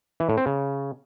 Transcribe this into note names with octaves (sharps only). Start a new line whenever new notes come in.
E3
A2
C4
C#3